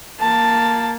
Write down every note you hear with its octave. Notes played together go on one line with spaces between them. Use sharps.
A#3 A5